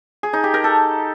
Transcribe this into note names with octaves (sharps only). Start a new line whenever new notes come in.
G#4
D#4
G4
A#4
A4